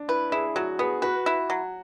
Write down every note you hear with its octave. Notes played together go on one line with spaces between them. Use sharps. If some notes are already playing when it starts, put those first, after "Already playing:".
Already playing: D4
E4 B4
E4 G#4
F#3 F#4
B3 G#4
F#4 B4
E4
F#3